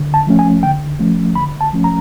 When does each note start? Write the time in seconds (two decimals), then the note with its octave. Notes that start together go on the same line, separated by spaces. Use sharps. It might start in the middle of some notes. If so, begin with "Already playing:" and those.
Already playing: D3
0.14 A5
0.27 F3 A3 C#4
0.39 G#5
0.63 D3 G5
1.00 F3 A3 C#4
1.35 D3 B5
1.61 A5
1.73 F3 A3 C#4
1.84 A#5